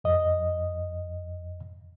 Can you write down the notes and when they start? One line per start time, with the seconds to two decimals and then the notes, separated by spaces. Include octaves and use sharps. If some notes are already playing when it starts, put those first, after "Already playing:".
0.04 F2 D#5